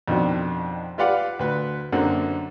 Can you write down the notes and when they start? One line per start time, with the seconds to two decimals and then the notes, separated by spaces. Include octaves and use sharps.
0.08 F2 B2 D#3 D4
0.98 F4 G4 B4 D5 F5 F#5
1.39 D2 B4
1.92 F#2 D3 A#3 C4 F#5